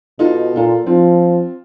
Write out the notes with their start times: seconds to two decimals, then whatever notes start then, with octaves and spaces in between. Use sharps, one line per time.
0.19 B2 D#4 F4 A4
0.56 A#2 F4 A4
0.86 F3 C4 F4